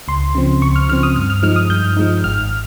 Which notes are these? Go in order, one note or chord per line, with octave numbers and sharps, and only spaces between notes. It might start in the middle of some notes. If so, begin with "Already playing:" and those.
C#2 C6
C#3 F3 C4
C#2 C#6
F6
C#3 F3 C4 F6
D#6
G2 F6
F6
F3 G#3 D#4 F6
D#6
G2 G6
F3 G#3 D#4
G#1 F6